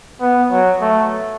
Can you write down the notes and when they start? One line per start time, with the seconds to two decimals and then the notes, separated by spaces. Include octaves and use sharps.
0.21 B3
0.51 F#3
0.81 A3